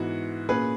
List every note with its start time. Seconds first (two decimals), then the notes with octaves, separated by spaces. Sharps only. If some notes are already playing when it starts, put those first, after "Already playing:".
Already playing: G#2 E3 B3 F#4
0.49 A#2 A#3 C#4 G#4 B4